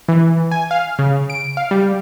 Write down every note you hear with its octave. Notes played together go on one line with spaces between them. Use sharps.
E3
G#5
F5
C#3
D7
F5
G3